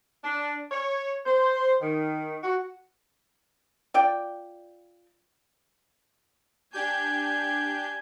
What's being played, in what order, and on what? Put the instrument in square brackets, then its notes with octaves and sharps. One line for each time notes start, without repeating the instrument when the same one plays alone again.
[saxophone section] D4
C#5
C5
D#3
F#4
[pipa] F4 D5 G5
[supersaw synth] D4 G4 G6 [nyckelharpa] G#5